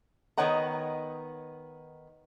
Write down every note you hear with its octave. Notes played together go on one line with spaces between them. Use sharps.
D#3 B3 C#5 D#5 F#5 A#5